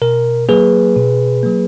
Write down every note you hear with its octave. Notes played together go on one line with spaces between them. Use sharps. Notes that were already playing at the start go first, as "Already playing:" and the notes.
B2 A#4
F#3 A#3 G#4 B4
B2
F#3 A#3